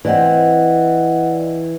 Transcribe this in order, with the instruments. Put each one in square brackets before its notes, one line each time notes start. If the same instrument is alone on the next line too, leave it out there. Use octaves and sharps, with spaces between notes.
[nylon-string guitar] E3 C4 [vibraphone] D5 D#5 F#5